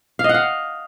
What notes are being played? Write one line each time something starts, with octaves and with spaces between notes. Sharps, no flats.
F5
D#5
F#5
F5